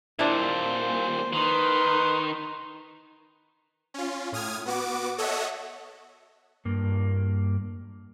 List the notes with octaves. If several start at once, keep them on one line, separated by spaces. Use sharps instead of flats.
D#2 A#2 D4 E4 C5
D#3 D#4 B4 C6
C#4 F4
A2 D#6 F6 G#6
B3 F#4 D6
A4 C#5 D#5 E5 F#5
G2 A#3